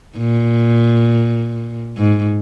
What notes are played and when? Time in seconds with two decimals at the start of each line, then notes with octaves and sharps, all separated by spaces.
0.17 A#2
1.97 G#2